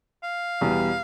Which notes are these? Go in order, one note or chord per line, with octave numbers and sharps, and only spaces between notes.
F5
E2 B2 G3